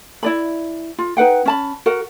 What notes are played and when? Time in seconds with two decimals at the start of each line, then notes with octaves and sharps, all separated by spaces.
0.23 E4 D5 B5
0.99 F4
1.17 D#4 B4 F#5 G5
1.46 C#4 A5 B5
1.86 F#4 A#4 F#5